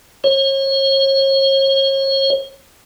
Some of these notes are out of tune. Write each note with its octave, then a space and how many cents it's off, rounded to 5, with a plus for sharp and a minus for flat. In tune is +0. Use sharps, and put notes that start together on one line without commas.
C#5 -40